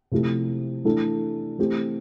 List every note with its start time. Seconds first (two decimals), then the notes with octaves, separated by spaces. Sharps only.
0.12 C3 F3 A3 E4 G4
0.85 E3 A3 D4 A4
1.59 E3 A3 C4 G4